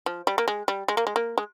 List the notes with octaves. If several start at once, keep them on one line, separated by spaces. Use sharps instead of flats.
F3
G3
A#3
G#3
G3
G#3
A#3
G#3
A#3
G#3